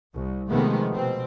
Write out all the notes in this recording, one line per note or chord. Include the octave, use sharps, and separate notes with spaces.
C2
C3 D#3 F3 G#3 A3 B3
B2 C4